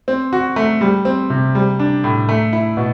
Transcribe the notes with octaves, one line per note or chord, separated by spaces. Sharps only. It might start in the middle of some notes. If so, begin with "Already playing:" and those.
C4
F#4
A3
G3
C4
C3
G3
D4
A2
A3
E4
B2